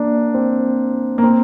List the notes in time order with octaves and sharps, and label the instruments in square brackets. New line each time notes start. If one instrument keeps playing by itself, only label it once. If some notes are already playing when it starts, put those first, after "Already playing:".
Already playing: [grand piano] A#3 D4
C4
A#3
C4